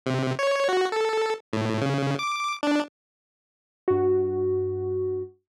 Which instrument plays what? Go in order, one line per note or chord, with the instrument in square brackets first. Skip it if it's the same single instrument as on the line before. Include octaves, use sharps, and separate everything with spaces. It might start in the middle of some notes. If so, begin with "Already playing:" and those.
[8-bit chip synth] C3
C#5
F#4
A4
A2
C#3
D6
D4
[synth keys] G2 F#4